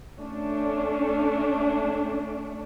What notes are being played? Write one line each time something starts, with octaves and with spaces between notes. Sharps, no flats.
A3 C#4 D4